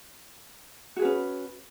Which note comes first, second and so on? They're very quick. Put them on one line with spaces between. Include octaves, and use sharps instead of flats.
F#4 G#4 B4 C#4